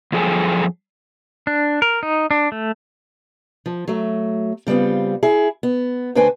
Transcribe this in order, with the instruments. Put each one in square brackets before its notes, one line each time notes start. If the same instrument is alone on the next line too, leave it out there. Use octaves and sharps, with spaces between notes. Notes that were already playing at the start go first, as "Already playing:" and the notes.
[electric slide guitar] F#2 F3 G#4 A4 G5 G#5
[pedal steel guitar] D4
A#4
D#4
D4
A3
[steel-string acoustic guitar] F3
F#3 A3
C#3 G3 B3 C4 F4
E4 G#4
B3
D2 D3 B4 C5 G5 G#5